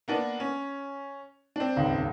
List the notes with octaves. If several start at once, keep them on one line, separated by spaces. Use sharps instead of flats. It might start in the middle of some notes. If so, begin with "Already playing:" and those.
A#3 B3 D4
C#4
C4 D4
D#1 C#2 G#2